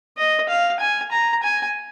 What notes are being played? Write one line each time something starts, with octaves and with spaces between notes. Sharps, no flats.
D#5
F5
G#5
A#5
G#5